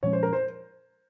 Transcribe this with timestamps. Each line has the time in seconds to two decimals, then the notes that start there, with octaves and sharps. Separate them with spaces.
0.03 A#2 F3 G#3 C#4 C#5
0.13 C5
0.23 A#4
0.33 C5